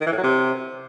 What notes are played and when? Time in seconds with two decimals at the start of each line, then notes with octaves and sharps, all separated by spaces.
0.01 D#3
0.07 E3
0.12 A2
0.18 F#3
0.23 C3